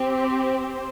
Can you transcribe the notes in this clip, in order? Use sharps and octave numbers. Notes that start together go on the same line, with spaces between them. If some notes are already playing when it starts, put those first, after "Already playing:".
Already playing: C4 G4
C5